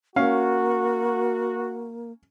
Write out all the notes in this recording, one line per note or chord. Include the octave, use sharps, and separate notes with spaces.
A#3 C#4 F#4 F5